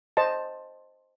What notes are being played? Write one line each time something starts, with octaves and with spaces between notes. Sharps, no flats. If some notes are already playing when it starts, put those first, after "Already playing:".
C5 D#5 A5